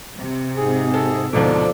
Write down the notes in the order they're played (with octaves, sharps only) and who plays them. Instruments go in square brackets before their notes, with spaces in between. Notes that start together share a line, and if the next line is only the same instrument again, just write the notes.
[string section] C3
[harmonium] G#2 G#4
[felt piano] A4
[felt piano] D2 G#2 B2 [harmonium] F3 A4 D5